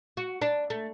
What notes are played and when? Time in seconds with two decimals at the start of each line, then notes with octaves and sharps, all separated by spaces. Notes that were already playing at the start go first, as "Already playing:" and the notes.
0.17 F#4
0.42 D4
0.70 A3